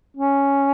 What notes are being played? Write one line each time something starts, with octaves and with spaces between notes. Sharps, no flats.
C#4